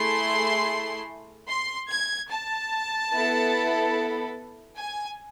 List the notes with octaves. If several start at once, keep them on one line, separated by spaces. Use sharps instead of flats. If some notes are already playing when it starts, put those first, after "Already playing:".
Already playing: A3 E4 G#4 C6
C6
G#6
A5
B3 E4 A4
G#5